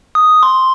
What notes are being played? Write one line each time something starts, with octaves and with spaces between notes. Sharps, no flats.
D#6
C6